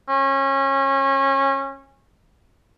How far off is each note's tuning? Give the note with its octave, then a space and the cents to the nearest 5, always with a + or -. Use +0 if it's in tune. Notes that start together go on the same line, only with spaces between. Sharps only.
C#4 -25